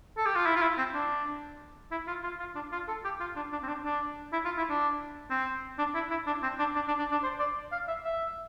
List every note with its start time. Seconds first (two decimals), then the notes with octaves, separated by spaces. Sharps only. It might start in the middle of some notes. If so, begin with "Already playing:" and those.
0.17 A4
0.26 G4
0.36 F4
0.46 E4
0.56 F4
0.62 E4
0.78 C4
0.94 D4
1.91 E4
2.07 F4
2.24 F4
2.39 F4
2.55 D4
2.72 F4
2.88 A4
3.04 G4
3.20 F4
3.36 D4
3.52 D4
3.63 C4
3.68 D4
3.85 D4
4.33 E4
4.45 F4
4.58 E4
4.69 D4
5.30 C4
5.78 D4
5.95 E4
6.10 E4
6.27 D4
6.43 C4
6.59 D4
6.75 D4
6.88 D4
6.99 D4
7.12 D4
7.23 C5
7.39 D5
7.72 F5
7.88 E5
8.05 E5